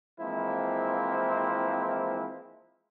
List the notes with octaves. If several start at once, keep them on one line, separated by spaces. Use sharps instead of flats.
E3 F3 G#3 A#3 C4 E4